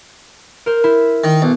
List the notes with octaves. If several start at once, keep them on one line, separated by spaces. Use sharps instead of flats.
A#4 C5
E4 C5
D#3
B1